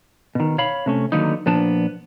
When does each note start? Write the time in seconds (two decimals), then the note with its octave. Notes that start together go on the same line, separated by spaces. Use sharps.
0.35 B2 D#3
0.58 C#5 F5 B5
0.86 C3 A3 C#4
1.12 D3 D#3 F#3 A#3 B3 D#4
1.46 A#2 F3 B3 D4 A5